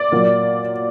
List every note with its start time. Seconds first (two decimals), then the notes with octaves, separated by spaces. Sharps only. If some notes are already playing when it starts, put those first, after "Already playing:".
Already playing: D5
0.12 A#2 F#3 A#3